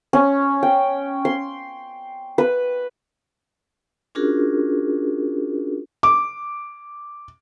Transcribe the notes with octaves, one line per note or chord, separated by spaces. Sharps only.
C#4
G5
C6
B4
C#4 D4 F4 F#4 G#4 A#4
D6